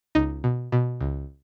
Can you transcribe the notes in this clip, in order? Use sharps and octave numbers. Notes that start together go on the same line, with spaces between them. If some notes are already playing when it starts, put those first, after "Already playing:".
C#2 D#4
B2
B2
C#2